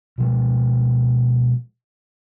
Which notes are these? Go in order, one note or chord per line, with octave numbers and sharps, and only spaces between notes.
B2 F3 G#3